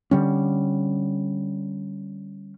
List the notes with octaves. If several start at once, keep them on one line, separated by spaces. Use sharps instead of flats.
D3 G3 C#4